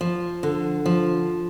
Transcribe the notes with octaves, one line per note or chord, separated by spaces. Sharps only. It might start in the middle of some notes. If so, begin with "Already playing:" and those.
F3
D3
F3